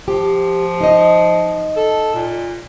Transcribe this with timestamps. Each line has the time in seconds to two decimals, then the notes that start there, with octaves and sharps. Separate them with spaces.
0.08 F3 G4
0.81 D#4 D#5
1.76 A4
2.14 A#2